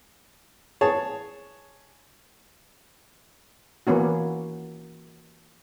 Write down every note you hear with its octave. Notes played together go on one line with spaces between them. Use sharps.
G#4 C#5 A5
E3 A#3 B3 C#4 F#4